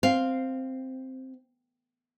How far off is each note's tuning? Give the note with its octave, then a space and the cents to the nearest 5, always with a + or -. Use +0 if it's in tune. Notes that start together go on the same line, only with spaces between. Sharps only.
C4 +0 F5 +0